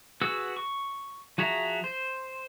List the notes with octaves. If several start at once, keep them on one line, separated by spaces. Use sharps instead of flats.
F#4 G#4 B4 F#5 E6
C#6
F3 F#4 G#4 E5 A#5
C5